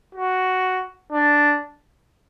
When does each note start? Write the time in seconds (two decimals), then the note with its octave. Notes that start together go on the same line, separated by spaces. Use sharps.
0.15 F#4
1.12 D4